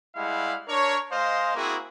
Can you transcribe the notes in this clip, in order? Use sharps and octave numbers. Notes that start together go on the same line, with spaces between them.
G3 G#3 E4 F5 F#5
D4 A#4 C#5
G#3 C5 D#5 F5
A#3 C4 E4 F#4 G#4